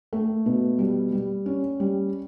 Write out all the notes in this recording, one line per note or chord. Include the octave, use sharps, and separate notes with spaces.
A3
B2
G3
G3
C#4
G3